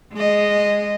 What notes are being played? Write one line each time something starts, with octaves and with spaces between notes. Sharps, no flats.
G#3 D#5